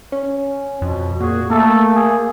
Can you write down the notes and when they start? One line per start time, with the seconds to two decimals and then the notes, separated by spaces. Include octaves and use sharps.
0.12 C#4
0.82 F2 B2
1.20 A#2 F#4 G#4
1.50 A3 A#3 A4
1.95 G#4